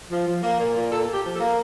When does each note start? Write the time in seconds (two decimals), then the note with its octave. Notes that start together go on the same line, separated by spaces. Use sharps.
0.11 F3
0.27 F3
0.43 A#3
0.59 A#2
0.76 A#2
0.91 A#2 A4
1.08 A#2
1.14 G4
1.24 F3
1.36 A4
1.40 A#3